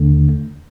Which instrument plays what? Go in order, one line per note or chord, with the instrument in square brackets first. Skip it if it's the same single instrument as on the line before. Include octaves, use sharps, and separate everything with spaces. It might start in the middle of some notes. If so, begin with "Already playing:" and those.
Already playing: [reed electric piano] D#2 D3 A3